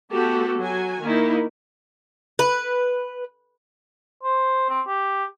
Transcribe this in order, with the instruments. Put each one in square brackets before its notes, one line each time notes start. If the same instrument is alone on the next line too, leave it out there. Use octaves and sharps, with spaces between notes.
[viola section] A3 B3 F#4 G4 A4
F#3 F#4 G#5
D#3 A#3 D#4 E4
[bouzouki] B4
[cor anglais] C5
C4
G4